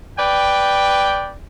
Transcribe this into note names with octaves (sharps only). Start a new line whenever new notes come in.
B4 D5 G5